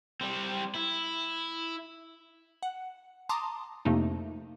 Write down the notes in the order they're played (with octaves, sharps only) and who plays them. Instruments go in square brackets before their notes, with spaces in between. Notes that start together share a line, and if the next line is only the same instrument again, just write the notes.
[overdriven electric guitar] G3 C4
E4
[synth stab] F#5
A5 A#5 C6 D6 D#6
F2 C3 A3 A#3 D4 D#4